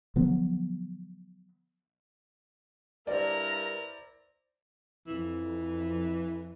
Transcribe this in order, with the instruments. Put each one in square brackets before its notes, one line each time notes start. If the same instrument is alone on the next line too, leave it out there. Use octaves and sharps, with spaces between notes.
[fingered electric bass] D3 F3 F#3 B3
[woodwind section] G2 A#4 [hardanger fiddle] E4 A#5 [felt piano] C5 D5
[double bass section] F2 [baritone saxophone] E3